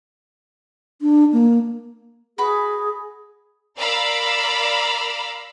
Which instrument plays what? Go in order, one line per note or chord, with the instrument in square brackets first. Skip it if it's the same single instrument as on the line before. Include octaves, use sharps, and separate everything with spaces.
[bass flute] D4
A#3
[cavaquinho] F#4 B4 B5 [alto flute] G#4
[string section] A#4 D5 F5 A#5 B5 E6